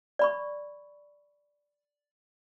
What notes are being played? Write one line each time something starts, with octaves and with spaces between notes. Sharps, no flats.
D5 B5 C#6